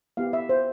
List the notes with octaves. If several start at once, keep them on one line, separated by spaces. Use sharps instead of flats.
B3 E4 G4 F5
E5
C5